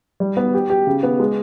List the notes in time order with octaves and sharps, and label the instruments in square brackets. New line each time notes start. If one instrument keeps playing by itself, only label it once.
[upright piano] G3
B3
G4
G4
C#3
B3
G#3